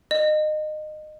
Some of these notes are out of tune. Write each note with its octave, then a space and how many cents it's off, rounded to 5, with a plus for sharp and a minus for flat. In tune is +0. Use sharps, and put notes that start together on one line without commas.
D#5 -25